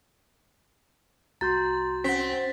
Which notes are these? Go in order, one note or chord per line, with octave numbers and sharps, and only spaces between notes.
C2 F#4 A#5 C6 G6 A6
C4 C#4 F#5 B6